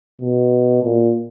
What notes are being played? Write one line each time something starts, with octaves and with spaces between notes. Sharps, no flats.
B2
A#2